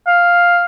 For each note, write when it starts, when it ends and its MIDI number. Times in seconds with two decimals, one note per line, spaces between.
0.07 0.65 77